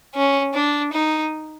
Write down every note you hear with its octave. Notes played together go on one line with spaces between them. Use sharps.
C#4
D4
D#4